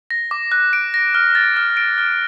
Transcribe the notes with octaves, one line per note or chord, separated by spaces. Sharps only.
A#6
D6
F#6
D7
A#6
F6
A6
F6
D7
F6